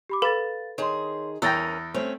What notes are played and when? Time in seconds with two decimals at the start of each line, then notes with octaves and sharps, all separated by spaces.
0.09 G4 B5 D6
0.22 A4 B4 F5 B5 A6
0.78 D#3 G#4 C#5 C6
1.42 E2 C#4 A#4 G5 G#5 E6 A6 A#6
1.94 A3 C4 C#4 C#5